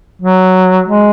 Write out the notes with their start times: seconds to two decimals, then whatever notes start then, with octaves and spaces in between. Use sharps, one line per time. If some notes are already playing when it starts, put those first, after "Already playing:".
0.22 F#3
0.88 G#3